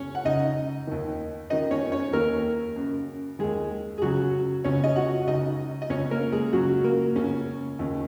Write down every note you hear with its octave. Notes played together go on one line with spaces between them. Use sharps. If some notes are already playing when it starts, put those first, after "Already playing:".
Already playing: C#2 C#4 C#5
F#5
C#2 C#3 D#4 D#5
D#2 D#3
F#2 D#3 D#4 D#5
C#4 C#5
C#4 C#5
D#2 D#3 A#3 A#4
F#2 C#3
D#2 D#3 G#3 G#4
G#4
C#2 C#3 F#3 F#4
C#2 C#3 C#4 C#5
D#5
F#4 F#5
C#2 C#3 D#4 D#5
D#5
C#2 C#3 C#4 C#5
A#3 A#4
G#3 G#4
C#2 C#3 F#3 F#4
A#3
C#2 C#3 C#4
D#2 C#3